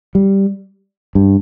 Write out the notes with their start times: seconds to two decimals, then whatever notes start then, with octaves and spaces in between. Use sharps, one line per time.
0.15 G3
1.15 G2